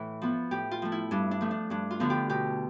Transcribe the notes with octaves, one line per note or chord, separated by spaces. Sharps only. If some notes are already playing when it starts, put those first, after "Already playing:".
Already playing: A2 E3
F3 B3
A2 G4
F4
F3 A3
E4
G2 D4
D4
F3 A3
D4
G2 D4
F4
D3 F3 B3
G4
B2 G4